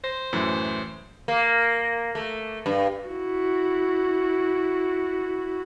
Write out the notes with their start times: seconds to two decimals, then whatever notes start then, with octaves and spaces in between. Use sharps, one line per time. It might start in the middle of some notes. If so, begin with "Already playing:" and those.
0.04 C5 A#6
0.33 F#2 A2 E3
1.28 A#3
2.15 A3
2.66 G2
3.09 E4 F#4